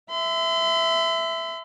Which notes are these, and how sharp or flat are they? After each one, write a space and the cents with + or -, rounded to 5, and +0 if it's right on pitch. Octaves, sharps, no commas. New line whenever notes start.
E5 +0 C6 -45